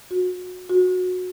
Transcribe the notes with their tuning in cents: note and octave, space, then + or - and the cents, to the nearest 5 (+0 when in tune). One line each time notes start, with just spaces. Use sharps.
F#4 -25
F#4 -20